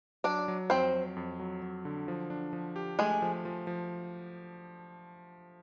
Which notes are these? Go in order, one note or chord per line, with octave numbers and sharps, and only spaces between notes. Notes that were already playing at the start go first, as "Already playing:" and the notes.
F#3 D4 D5
F#3
F2 C4 C5
F#3
F2
F#3
F#3
D3
F3
D4
F3
G4
G#3 A3 G#4
F3
F3
F3